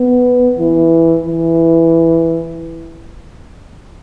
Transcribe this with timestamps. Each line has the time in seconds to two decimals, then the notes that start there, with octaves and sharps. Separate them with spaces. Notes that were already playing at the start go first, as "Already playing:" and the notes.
Already playing: B3
0.59 E3
1.26 E3